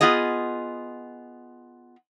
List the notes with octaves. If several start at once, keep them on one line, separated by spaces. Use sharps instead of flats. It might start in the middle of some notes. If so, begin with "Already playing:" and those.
B3 F4 G#4 D#5